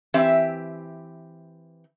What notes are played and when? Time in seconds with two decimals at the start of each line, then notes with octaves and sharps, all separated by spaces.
0.14 E3 C4 G4 E5